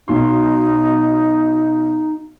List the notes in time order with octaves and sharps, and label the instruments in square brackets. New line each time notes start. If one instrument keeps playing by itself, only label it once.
[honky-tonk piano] B1 B2 C6 [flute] D#4